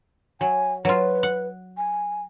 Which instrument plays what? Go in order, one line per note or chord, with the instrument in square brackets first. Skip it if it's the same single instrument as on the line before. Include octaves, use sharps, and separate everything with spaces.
[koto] F#3 [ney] G#5
[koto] F#3 F4 [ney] B4
[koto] F#5
[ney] G#5